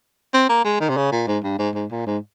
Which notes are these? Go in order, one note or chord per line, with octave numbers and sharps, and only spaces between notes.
C4
A#3
G#3
D#3
C3
C#3
A#2
G#2
G2
G#2
G#2
A#2
G#2